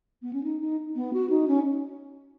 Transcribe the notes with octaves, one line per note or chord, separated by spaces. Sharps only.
B3
C#4
D#4
D#4
B3
F#4
D#4
C#4